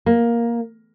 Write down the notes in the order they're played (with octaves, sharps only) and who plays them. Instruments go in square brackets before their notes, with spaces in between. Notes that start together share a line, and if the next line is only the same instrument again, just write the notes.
[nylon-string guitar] A#3